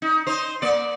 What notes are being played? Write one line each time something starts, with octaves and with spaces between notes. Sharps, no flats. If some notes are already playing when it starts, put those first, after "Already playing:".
D#4
D#4 C5
A#3 D5